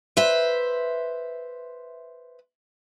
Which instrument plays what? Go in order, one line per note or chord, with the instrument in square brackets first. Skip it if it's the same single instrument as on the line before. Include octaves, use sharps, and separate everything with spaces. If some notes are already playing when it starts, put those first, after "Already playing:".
[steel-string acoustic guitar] B4 C5 E5